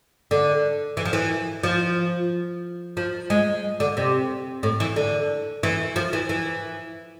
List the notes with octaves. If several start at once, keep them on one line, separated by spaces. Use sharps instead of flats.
D3
E3
F3
E3
F3
F3
G#3
D3
C3
A2
E3
D3
E3
F3
E3
E3